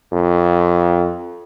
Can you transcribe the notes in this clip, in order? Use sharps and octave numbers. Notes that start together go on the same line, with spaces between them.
F2